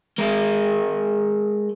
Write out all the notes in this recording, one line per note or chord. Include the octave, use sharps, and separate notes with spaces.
G#3 A#4